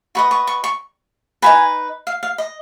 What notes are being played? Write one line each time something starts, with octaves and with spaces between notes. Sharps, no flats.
F#4 B4 D#5 C#6
C#6
C#6
C#6
D#4 F#4 B4 G#5
F5
F5
D#5